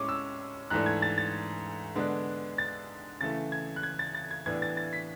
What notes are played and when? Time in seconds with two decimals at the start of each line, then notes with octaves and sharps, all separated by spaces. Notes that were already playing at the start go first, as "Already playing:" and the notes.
Already playing: A2 G#3 C#4 C#6 D6
0.09 E6
0.70 G#2 E3 A3 D4 F#6
0.86 G#6
1.02 A6
1.18 A6
1.95 D3 G#3 B3 D4
2.58 A6
3.21 C#3 E3 A3 A6
3.52 G#6
3.76 F#6
3.83 G#6
3.99 A6
4.15 A6
4.31 G#6
4.46 A2 E3 B3 D4 G#6
4.62 A6
4.77 A6
4.93 B6